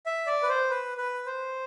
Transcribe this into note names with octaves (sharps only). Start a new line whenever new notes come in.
E5
D5
B4
C5
B4
B4
C5